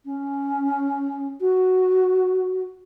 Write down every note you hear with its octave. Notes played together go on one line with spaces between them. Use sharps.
C#4
F#4